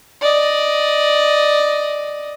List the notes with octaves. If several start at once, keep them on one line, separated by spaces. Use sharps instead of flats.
D5 D#5